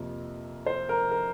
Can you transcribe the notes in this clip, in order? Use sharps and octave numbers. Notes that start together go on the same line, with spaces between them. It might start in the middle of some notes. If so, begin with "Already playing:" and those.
Already playing: F2 C3 F3 A#3
C5
A#4
A#4